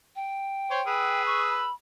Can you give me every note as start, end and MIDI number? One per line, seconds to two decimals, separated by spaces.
0.16 1.22 79
0.71 0.81 72
0.71 0.81 73
0.87 1.65 68
0.87 1.65 71
0.87 1.65 88
1.26 1.42 85
1.50 1.71 83